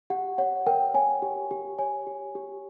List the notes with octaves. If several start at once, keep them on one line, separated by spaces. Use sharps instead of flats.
G4 F#5
C#5 F#5
A#4 G5
C#5 G#5
G4
G4
C#5 G#5
G4
G4